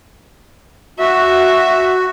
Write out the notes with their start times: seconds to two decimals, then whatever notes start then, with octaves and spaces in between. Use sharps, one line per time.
0.99 F#4 E5